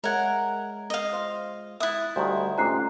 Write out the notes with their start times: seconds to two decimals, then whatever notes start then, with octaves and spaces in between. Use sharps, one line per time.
0.04 G#3 A#4 C#5 E5 F#5 G#6
0.90 D#5 F5
1.12 F4 C5
1.80 E4 E5 D#6 F#6 A6
2.16 D2 D#3 G3 C5
2.58 G#2 C3 A3 C#4 F4 A#5 F#6 C7